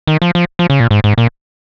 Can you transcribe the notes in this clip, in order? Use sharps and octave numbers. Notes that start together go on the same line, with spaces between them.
D#3
F3
F3
F3
C#3
A#2
G#2
G#2
A#2